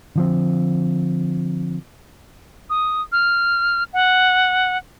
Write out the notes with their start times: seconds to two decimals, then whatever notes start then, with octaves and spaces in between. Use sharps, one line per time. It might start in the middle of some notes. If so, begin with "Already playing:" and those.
0.16 D3 F3 C4
2.70 D#6
3.12 F6
3.93 F#5